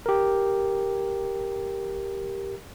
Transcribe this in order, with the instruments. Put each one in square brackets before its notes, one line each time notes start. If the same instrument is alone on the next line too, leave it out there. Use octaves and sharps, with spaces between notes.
[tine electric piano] G4 A#4